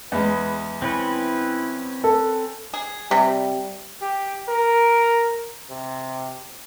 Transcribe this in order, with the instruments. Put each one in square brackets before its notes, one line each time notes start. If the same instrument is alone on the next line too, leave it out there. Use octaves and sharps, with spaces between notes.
[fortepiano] E2 G#3 [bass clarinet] B4
[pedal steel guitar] C4 C#4 B4 [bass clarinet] E4
[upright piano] A4
[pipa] G#4
[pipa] C3 [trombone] G3
[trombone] G4
A#4
C3